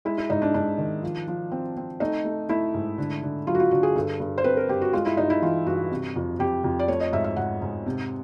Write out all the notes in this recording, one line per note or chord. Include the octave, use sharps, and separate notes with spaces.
G#3 E4
E4
G#2 D#4
D4
G#2 D4
D#3
F3
F3
C4
C4
A3 D#4
A3
A3 E4
G#2
D3
D3
F#3 F4
F#4
F4
D3 F#4
G#4
G2 A4
G2
C5
C4 B4
A#4
G2 G4
F#4
G#3 F4
E4
G2 D#4
E4
E3 F4
G2 F#4
C3
F2
F2 G4
F2
D5
A3 C#5
D#5
G#2 E5
E5
G#2 F#5
G#2
C3